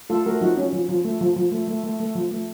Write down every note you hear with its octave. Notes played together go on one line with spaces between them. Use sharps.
A3 F4 A4
A3 F#4 A#4
F3 D#4 F#4
C#4
F3
F3
A3
F3
F3
A3
A3
A3
A3
F3
A3